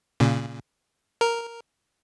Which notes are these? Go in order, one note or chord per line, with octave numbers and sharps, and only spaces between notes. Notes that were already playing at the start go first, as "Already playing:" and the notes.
A#2 C#3
A#4